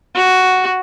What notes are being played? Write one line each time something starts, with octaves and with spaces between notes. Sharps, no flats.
F#4